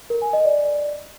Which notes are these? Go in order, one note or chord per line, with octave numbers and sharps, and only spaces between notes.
A#4
G#5
D#5
D5